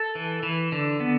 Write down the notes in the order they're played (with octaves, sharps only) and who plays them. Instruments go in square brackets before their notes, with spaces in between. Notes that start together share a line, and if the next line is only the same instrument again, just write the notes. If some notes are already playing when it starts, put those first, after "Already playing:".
Already playing: [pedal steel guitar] A4
E3
E3
D3
B3